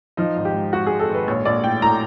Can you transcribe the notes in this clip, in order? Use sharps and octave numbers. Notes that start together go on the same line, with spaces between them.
F3 D#4
G#1
G4
G#2
G#2 F#4
G#3 G#4
A4
G#1
B4
A#1 C#5
A#1 D5
A2 G5
A2 A#5